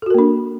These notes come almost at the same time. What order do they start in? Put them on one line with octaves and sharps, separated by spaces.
A4 F#4 A#4 A#3 D4